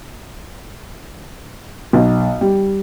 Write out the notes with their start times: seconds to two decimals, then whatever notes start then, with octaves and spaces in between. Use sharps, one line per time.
1.93 B1
2.41 G3